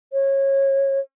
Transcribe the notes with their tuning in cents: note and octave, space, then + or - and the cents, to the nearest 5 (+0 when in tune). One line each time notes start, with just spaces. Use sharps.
C#5 -25